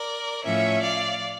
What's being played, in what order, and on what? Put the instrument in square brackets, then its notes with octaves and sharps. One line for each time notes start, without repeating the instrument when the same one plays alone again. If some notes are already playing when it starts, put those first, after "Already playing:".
Already playing: [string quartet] A#4 D5
A2 F3 C#4 C#5 E5
D5 F5